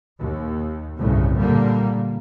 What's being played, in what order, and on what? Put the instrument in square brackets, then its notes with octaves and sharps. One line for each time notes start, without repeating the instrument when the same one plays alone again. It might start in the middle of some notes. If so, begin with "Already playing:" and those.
[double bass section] D#2
G1 C2 A2 C#3
A#2 D3 G3 A#3